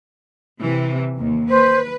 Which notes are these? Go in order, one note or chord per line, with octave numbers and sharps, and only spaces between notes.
C3 E3
D#2
B4 C5